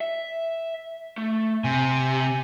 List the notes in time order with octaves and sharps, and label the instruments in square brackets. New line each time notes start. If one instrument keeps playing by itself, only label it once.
[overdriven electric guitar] E5
A3
[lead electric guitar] C3 [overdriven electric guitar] G#5